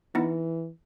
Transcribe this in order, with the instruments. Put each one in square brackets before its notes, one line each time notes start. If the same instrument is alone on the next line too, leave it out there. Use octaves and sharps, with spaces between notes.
[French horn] E3 [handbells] B3 D#4 E4